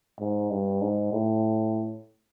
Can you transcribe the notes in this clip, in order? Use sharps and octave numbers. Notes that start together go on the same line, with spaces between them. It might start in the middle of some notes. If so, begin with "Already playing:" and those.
G#2
G2
G#2
A2